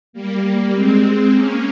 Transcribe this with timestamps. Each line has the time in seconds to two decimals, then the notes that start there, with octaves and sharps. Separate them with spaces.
0.13 G3 A#3
0.73 G#3 C4
1.33 A#3 C#4